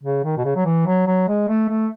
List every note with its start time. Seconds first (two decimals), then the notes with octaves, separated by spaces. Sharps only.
0.03 C#3
0.24 D#3
0.37 B2
0.44 C#3
0.56 F#3
0.65 E3
0.86 F#3
1.07 F#3
1.28 G#3
1.48 A3
1.68 A3